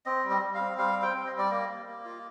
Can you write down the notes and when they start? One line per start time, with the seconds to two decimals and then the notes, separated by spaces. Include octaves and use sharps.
0.06 C4 D#5
0.24 G3
0.30 D#5
0.42 G3
0.54 F5
0.60 C4
0.78 G3 F5
0.97 C4
1.02 G5
1.14 C4
1.26 D#5
1.33 G3
1.38 D5
1.51 A#3 D#5
1.69 A#3
1.87 A#3
2.05 F4